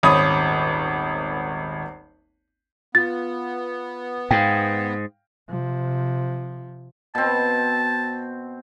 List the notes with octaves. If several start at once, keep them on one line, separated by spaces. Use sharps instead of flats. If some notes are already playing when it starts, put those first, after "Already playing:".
D#1 G#1 C#5 B5 D#6
B3 F4 A6
G#2 F5 G5
C3 F3
B2 C4 A5